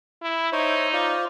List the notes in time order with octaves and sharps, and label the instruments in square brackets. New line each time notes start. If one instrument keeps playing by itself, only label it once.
[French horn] E4
[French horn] D#4 [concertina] C5 C#5 E5
[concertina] F4 C5 D5